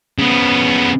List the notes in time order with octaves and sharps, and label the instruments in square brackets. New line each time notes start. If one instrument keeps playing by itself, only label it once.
[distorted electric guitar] C#3 B3